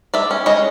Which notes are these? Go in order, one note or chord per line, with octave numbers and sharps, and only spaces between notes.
G#3 D5 E5
C#4
G#3 C#5 D#5